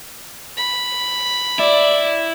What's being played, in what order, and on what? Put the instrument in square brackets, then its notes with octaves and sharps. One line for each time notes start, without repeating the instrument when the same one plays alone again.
[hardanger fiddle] B5
[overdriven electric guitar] E4 [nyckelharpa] D5